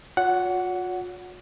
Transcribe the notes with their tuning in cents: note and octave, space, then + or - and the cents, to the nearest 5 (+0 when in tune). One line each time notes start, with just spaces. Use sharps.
F4 +45 C#5 +40 F#5 +0